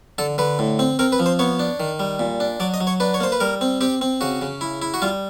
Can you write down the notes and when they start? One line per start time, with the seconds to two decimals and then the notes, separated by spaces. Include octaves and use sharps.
0.18 D3 A4
0.38 D3 B4
0.59 A2
0.79 C4
0.99 C4 A#4
1.12 B4
1.19 F3
1.26 C5
1.39 B3 C#5
1.59 D4
1.80 D#3
2.00 G3
2.19 A#2
2.40 D4
2.60 F#3 D5
2.74 D#5
2.80 F#3
2.87 C#5
3.00 D4 B4
3.14 C#5
3.20 A#3 C5
3.32 B4
3.40 G3 A#4
3.61 C4
3.81 C4 G4
4.01 C4
4.21 C#3 F#4
4.42 C#3
4.61 E4
4.82 E4
4.94 F#4
5.02 G3 F4